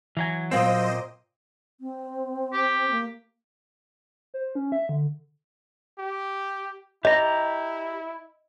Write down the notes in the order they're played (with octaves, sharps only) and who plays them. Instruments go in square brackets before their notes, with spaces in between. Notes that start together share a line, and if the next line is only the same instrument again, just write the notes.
[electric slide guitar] E3 F#3 G#5
[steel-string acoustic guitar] A#2 A#3 G5 [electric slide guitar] F#3 C4 [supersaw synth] C5 D#5
[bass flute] C4
[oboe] G4
[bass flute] A#3
[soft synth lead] C5
C#4
E5
D3
[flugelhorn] G4
[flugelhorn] E4 [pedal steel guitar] G4 A#5 [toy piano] D#5